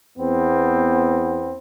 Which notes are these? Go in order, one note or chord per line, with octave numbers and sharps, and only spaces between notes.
E2 B3 C4